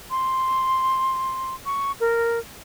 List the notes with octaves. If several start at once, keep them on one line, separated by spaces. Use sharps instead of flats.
C6
C#6
A#4